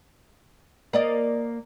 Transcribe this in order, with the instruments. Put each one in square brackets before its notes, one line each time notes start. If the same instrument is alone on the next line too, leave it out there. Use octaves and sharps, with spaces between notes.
[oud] A#3 D5 D#5